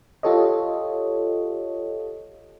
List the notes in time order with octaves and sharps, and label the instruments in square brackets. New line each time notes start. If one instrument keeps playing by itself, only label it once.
[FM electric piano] F4 G4 A4 C#5 D#5